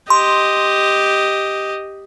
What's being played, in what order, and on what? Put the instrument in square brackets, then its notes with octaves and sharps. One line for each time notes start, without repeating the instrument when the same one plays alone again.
[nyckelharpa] G4 D#5 [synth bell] C6